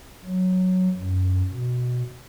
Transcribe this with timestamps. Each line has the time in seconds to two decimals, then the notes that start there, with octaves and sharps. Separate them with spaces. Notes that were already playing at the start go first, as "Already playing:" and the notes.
0.24 F#3
0.97 F#2
1.51 B2